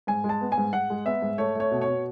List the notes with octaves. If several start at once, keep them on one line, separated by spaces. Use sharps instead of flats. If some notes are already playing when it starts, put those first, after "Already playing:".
G#2 G#5
G#3
A5
B3
G#5
G#2
G#2 F#5
G#3
B3 E5
G#2
A3 C#5
A3 C#5
B2
C#5
B2